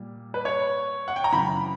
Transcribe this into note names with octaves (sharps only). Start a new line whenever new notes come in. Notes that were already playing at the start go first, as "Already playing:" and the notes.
Already playing: A#2 G3
B4
C#5
F#5
G5
A#5
F#2 C#3 E3 B5